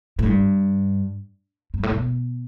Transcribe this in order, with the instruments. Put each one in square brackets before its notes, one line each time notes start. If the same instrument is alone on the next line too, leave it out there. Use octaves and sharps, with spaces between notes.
[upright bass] A2
G2
G2
A2
B2